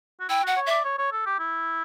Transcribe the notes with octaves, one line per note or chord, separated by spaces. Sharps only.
F#4
E4 G5
F#4 F#5
C#5
D5 E5
C#5
C#5
A4
G4
E4